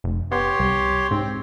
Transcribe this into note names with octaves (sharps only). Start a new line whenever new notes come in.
F1
B3 G4 C#5 C6
C2
G#2 C4